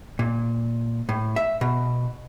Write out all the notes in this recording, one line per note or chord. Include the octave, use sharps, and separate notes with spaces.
A#2
A2
E5
B2